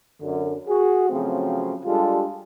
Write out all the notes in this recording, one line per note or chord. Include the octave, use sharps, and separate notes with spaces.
F#2 D3
F#4 G#4
C#3 F3 F#3 A3 C4
G3 G#3 D4 F4 G4 A4